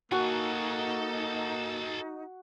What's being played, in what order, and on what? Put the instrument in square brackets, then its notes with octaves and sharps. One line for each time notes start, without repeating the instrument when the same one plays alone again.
[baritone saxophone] A#3 [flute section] D#4 [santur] F#4 [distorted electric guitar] A4 G#5